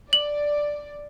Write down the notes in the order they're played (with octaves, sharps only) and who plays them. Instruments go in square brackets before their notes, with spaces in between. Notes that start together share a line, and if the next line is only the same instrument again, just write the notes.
[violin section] D5 [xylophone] F#7